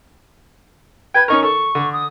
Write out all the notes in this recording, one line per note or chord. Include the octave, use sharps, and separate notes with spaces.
B4 G5 G#6
C#4 D#4 A#4 C#6
A4 C#6
D3
D#6